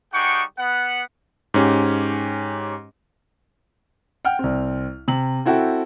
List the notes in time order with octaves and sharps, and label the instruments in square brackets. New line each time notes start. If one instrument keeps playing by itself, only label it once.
[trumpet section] G3 D#4 G#4 F#5 G5 C#6
B3 F#5
[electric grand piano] G#2 C#4 G4
[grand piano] F#5 G5 F6
C2 C4
C3 F#7
C4 E4 F#4 A4 G5